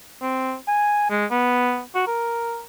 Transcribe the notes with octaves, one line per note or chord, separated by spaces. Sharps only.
C4
G#5
G#3
B3
F#4
A#4